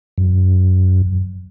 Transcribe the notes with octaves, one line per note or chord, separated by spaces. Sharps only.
F#2